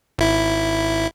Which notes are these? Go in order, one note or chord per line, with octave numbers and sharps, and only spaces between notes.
G#1 E4